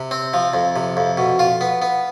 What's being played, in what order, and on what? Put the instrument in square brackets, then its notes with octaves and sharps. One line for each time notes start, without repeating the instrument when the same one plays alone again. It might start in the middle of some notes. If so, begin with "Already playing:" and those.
Already playing: [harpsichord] C3
C4
F3
F2
C3
F2
B2
F4
B3
B3